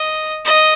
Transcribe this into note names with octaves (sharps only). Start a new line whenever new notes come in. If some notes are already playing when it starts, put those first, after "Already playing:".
Already playing: D#5
D#5